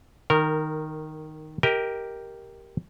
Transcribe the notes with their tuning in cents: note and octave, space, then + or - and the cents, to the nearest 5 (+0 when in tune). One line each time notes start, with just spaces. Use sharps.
D#3 +0 A#4 -15
G4 +0 A#4 +0 D#5 +30